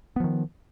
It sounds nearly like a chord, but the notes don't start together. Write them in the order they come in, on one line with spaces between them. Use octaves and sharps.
B3 F3 D#3